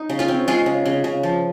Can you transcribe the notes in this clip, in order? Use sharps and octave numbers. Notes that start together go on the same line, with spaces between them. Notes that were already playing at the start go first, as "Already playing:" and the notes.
Already playing: D#4
C#3
C#4 F4
C4
G#3 F4 G#4
C#3
C#3
C#3
F3